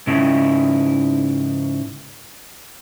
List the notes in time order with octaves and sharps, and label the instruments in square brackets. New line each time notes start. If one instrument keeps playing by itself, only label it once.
[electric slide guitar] G#2 C#3 E4